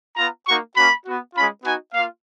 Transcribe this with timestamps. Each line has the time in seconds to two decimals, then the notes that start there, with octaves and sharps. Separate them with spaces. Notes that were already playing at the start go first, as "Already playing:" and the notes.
0.16 B3 F4 A#5
0.46 A#3 D#4 F#4 C#6
0.75 A#3 C#4 F#4 B5
1.05 B3 F#4
1.34 G#3 C#4 F4 B5
1.64 B3 D#4 F#4 G#5
1.93 A#3 F4 F5